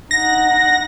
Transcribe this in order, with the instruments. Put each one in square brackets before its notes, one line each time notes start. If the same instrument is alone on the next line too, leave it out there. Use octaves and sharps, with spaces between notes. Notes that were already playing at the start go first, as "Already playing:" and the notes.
[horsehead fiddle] D#4 F#5 [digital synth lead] A#6